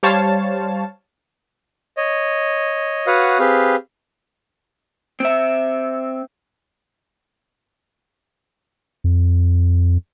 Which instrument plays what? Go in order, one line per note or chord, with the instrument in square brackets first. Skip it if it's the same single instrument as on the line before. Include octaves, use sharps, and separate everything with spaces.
[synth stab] G3 C5 C#5 F5 A5
[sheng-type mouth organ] C#5 D#5
F#4 B4 C#5 F5 F#5 D#6
C4 G4 G#4 B4 F5
[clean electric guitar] C4 E5
[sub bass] F2